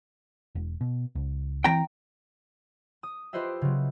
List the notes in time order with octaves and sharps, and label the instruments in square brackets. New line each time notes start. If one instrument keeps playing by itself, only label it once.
[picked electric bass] E1
B2
C#2
[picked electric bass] E3 C4 [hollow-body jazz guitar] G5 A#5
[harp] D#6
F4 G4 B4 C5 D#5 E5
C#3 F#3